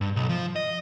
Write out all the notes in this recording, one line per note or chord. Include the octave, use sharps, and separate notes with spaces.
G2
B1
F3
D#5